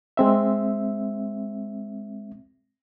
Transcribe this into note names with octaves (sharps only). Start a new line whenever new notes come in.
G#3 C4 E5